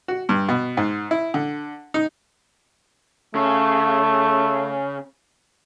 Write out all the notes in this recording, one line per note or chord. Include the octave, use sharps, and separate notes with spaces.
F#4
G2
B2
G#2
E4
D3
D#4
C#3 A3